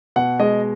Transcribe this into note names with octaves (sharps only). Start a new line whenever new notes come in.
B2 F#5
G#3 D#5